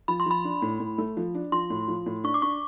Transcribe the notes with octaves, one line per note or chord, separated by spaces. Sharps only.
F3 B5
C6
F3 B5
D4
A2
A2
A3
F3
D4
F3 C6
A2
F3
A2
D4 C#6
D6
D4 C#6